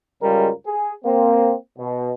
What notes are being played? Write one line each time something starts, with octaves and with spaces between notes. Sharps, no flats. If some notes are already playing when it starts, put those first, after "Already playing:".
C#2 F#2 G3 G#3 F4 A#4
G#4
A#3 C4
B2